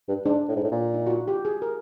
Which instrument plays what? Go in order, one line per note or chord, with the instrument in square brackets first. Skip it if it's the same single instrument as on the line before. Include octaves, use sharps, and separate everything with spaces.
[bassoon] G2
[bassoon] G#2 [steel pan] D4
[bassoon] A2
G#2
A2
A#2
[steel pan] D#4
F#4
F4
G4
G#4
A#4